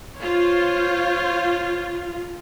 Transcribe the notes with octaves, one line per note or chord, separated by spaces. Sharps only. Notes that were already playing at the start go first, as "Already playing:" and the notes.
F4 C5 C#5